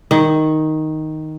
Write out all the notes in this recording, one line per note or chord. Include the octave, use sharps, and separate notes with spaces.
D#3